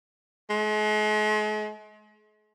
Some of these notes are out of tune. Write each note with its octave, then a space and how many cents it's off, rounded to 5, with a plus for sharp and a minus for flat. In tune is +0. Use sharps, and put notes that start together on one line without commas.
G#3 +40